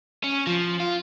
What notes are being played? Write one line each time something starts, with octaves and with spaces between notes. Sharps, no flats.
C#4
F3
F4